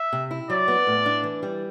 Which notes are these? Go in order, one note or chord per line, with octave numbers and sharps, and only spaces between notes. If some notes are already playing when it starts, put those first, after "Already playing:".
Already playing: E5
C3
E4
F#3 D5
B3
A2
D4
E3
G3